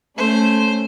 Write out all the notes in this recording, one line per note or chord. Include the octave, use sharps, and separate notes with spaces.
A3 C#4 C5